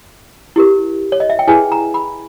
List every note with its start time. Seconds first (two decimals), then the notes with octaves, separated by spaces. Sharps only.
0.56 E4 G4 A#4
1.12 C#5
1.20 D#5
1.30 E5
1.39 G5
1.47 E4 G#4 B4 G#5
1.72 A#5
1.94 B5